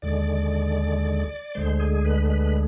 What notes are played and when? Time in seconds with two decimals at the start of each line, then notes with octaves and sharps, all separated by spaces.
0.02 D#2 D3 G#3 D5
1.55 D2 D3 G#3 C5
1.80 G#4
2.05 B4
2.30 B4